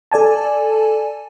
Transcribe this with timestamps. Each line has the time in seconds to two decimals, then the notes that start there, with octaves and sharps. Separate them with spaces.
0.12 A4 D5 G#5 A5